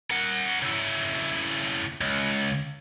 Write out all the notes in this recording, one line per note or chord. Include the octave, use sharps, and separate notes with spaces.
A#4 F#5
C#3 E4
C#2